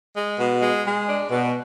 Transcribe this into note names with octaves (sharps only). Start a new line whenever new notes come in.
G#3
B2
G#3
G#3
D4
B2